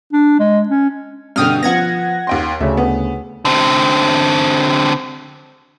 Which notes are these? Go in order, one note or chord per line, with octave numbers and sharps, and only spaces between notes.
D4
G#3
C#4
G2 B2 D3 G5 D#6 F6
F3 B3 F#5 G#6 A#6
D#2 G5 C6
D2 C#3 E5
B3
D3 C4